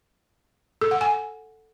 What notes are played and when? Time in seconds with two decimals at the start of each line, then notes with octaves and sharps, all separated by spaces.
0.82 A4
0.91 F#5
1.01 G#5